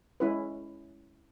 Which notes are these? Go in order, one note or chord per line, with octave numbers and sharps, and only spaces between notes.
G#3 C#4 E4 B4